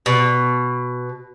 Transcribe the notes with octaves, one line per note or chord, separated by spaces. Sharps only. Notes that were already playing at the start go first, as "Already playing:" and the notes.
B2